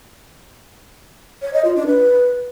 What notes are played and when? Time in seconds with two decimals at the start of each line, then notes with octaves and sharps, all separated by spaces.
1.42 C#5
1.53 D#5
1.65 F4
1.76 D4
1.87 B4